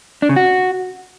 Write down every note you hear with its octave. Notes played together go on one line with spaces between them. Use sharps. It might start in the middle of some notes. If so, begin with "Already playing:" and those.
D4
C#3
F#4